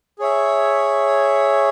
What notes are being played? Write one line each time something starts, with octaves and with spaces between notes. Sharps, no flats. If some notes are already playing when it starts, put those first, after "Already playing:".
G#4 C#5 E5